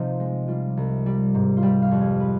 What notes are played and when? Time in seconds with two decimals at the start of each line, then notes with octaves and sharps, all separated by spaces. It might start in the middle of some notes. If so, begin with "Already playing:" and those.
Already playing: C3 F3 C4 D#4 F4
0.20 G#3
0.48 G3 F4
0.77 C2
1.06 G3
1.34 G#2
1.57 F4
1.63 G3 G4
1.82 F5
1.91 F2
2.00 G#4
2.20 B4